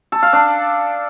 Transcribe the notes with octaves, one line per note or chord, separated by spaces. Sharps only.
A4
F5
D4